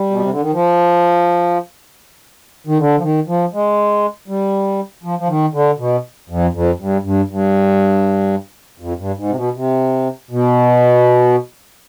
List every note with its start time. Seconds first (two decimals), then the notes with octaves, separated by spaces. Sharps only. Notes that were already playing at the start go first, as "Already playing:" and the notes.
Already playing: G3
0.11 B2
0.20 C3
0.30 D3
0.41 D#3
0.53 F3
2.67 D#3
2.79 D3
2.98 F3
3.02 D#3
3.28 F3
3.54 G#3
4.28 G3
5.04 F3
5.19 F3
5.28 D#3
5.54 D3
5.79 B2
6.29 F2
6.54 F2
6.80 G2
7.04 G2
7.30 G2
8.80 F2
8.99 G2
9.18 G#2
9.29 C3
9.36 B2
9.55 C3
10.31 B2